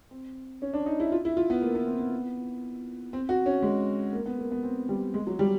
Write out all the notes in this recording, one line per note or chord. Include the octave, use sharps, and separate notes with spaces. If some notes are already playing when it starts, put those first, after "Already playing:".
C4
C#4
D4
D#4
E4
F4
E4
F4
B3
A#3
B3
C4
B3
C4
F#4
C#4
G#3
A#3
B3
A#3
B3
C4
G3
G#3
F#3
G3